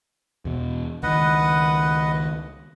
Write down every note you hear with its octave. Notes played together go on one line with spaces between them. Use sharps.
E2 B2
C#2 D#3 B4 D#5 F#5